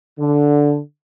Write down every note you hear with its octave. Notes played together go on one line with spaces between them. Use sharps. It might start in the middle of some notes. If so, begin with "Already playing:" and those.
D3